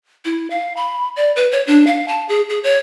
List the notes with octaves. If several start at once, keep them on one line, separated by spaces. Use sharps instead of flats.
E4
F5
B5
D5
B4
C#5
D4
F5
A5
G#4
G#4
C#5